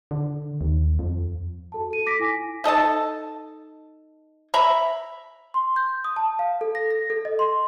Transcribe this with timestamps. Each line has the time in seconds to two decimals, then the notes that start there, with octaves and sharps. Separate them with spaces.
0.11 D3
0.61 D#2
0.99 F2
1.72 F#4 A4 A5
1.91 A4 D#7
2.06 D6 A#6 B6 D7
2.19 E4 G#5
2.64 D#4 A4 D#5 A5
4.54 E5 A#5 B5
5.54 C6
5.76 G6
6.04 D#6
6.16 A5
6.39 F5
6.61 A4
6.75 A#6
6.91 A#6
7.10 A4
7.25 D#5
7.39 C6